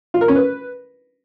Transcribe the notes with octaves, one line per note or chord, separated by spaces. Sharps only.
F4
A#4
C#4
B4